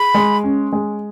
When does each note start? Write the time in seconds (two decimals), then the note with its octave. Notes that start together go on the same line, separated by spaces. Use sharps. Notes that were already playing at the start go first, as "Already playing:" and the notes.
Already playing: G#4 B5
0.14 G#3
0.44 C#4
0.72 G#3